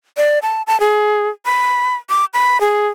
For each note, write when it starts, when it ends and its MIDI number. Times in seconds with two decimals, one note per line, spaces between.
0.17 0.39 74
0.42 0.62 81
0.67 0.79 81
0.80 1.29 68
1.46 1.95 83
2.10 2.25 86
2.34 2.60 83
2.61 2.88 68